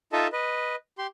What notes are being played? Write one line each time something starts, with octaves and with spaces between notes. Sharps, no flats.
D#4 F4 A4 D#5 E5 A5
B4 D#5
G4 C6